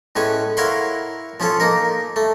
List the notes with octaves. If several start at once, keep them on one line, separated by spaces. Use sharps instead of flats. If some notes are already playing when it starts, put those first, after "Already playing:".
A2 G#3 C#4 B4 G#5
E4 A#4 C#5 F5 F#5 C6
F3 C#4 F4 A4
A#3 D#4 A#4
A3